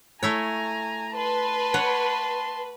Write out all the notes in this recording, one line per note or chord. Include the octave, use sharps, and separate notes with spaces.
A3 E4 C#5 G#5 A#5
B4 A5 C6
C#5 F#5